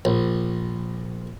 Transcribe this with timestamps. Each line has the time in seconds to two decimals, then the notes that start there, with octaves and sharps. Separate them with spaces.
0.05 A#1